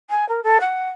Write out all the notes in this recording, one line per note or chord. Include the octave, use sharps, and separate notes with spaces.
G#5
A#4
A4
F#5